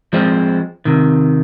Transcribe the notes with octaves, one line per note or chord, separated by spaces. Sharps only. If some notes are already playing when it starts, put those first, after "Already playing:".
F3 G#3 C4
C3 D#3